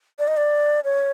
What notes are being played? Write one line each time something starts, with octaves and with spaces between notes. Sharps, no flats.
D5
D#5
D5
C#5